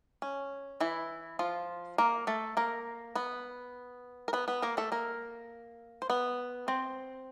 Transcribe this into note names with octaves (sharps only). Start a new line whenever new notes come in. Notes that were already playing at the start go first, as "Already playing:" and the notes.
C#4
E3 E4
F3 F4
A#3 A#4
A3 A4
A#3 A#4
B3 B4
A#4
B3 B4
B3 B4
A#3 A#4
A3 A4
A#3 A#4
C5
B3 B4
C4 C5